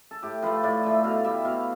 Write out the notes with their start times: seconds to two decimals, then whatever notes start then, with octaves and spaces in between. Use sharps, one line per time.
0.11 A4
0.23 A2 G4
0.42 F3 A3 B4
0.63 A2 D5
0.83 F3 A3 E5
1.04 B2 F5
1.24 G3 E5
1.45 B2 F5